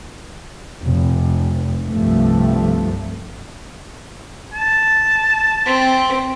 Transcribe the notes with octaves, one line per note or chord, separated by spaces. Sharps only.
F1
C2 G2 C3 F3 A3
A5
C4